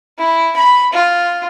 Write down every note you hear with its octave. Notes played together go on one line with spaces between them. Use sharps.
E4
B5
F4